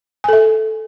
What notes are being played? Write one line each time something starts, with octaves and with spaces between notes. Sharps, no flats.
A4 E5 G#5